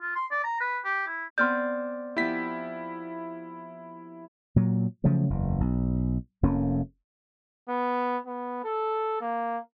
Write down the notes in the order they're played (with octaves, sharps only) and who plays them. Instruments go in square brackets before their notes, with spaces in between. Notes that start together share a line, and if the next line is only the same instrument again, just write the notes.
[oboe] F4
C6
D5
A#5
B4
G4
E4
[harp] B3 C4 D5 [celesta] C6 F6 G6
[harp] F3 B3 G4 [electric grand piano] E4 B6
[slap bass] A#2 F#3
C#3 F3 F#3 A3
F#1 E2
B1
F1 F2 A#3 C#4
[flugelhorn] B3
B3
A4
A#3